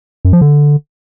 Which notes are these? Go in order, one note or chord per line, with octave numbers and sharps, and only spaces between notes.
F#2
F3
D3